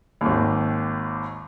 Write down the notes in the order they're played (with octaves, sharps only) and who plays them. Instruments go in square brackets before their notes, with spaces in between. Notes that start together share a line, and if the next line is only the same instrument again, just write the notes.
[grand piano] G#1 D#2